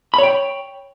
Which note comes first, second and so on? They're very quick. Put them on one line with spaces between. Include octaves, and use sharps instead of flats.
B5 C#5 G5